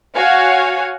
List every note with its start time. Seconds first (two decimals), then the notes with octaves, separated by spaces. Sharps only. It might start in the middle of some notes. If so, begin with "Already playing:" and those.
0.15 F#4 C#5 F5 F#5 G#5